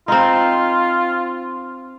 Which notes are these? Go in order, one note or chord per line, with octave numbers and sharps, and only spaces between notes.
C4 D#4 F4